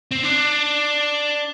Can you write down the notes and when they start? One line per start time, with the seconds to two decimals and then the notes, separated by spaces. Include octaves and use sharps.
0.11 C4
0.23 D4